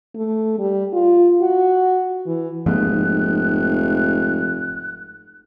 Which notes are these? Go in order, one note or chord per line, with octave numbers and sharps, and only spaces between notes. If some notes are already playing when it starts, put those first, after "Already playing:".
A3
G3
F4
F#4
E3
F1 G#2 F3 A#3 F#6